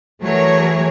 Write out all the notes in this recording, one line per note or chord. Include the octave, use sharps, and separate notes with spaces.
E3 F#3 A3 G#4 A#4 C#5